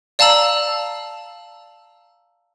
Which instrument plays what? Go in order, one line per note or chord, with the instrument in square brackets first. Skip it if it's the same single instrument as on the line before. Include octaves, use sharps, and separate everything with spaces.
[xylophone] D5 F5 A5 A#5 E6 F#7